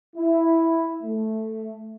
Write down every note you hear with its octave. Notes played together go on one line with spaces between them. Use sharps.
E4
A3